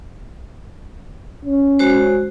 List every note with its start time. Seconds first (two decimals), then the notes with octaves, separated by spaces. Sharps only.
1.45 C#4
1.79 G#3 F#4 C5